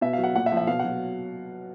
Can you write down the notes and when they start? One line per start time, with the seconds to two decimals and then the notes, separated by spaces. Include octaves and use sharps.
0.01 B2 E5
0.13 F5
0.18 F#3
0.24 F#5
0.35 A#2 F#5
0.46 E5
0.52 F3
0.57 E5
0.67 B2 F5
0.79 F#5
0.84 F#3